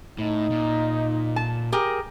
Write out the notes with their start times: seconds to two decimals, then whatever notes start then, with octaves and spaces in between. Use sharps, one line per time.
0.18 A2 D#4
0.51 A#2
1.36 A5
1.72 G4 G#4 A#4